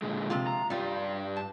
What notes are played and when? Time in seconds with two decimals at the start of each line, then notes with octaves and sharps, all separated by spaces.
0.02 A#2 D3 G#3
0.30 C3 F3 F4
0.47 A#5
0.70 G2 G3 F4 D5
1.36 A5